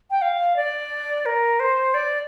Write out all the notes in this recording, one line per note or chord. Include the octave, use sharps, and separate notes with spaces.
G5
F5
D5
A#4
C5
D5